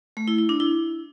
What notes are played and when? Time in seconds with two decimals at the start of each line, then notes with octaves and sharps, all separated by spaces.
0.17 A3
0.28 E4
0.38 E4
0.49 D4
0.60 E4